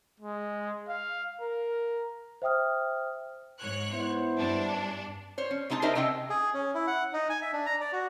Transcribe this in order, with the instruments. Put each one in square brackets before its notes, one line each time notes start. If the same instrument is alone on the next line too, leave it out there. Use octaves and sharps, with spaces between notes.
[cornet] G#3
F5
A#4
[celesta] C5 E5 G5 D#6 F6
[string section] G#2 C#5 F#6
[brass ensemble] B3 E4 C5
[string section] G2 D4
[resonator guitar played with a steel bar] C5 C#5
C#4
C3 G#3 D#4 G4 A5
D4 D#4 A#4 C5 D#5 E5
C3 C4 C#4 D#5 G5
[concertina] G#4
C#4
E4
F#5
D#4
G#5
E5
D4
A#5
D5
F#4